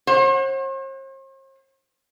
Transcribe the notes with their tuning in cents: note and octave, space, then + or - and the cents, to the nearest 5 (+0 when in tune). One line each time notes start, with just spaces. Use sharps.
C5 +45 F#5 +0